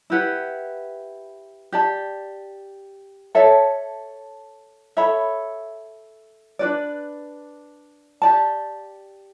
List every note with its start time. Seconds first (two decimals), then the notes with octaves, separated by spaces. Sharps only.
0.10 E4 G4 B4 F#5
1.72 G4 D5 A5
3.35 A4 C#5 E5 A5
4.97 A4 C#5 E5 B5
6.59 D4 F#4 B4 D5
8.22 G4 D5 A5